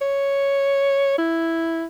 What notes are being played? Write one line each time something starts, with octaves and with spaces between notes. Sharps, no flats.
C#5
E4